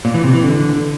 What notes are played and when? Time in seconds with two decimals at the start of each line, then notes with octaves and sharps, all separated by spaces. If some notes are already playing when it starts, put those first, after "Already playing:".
0.05 A#2
0.14 E3
0.24 C3
0.33 E3
0.43 D3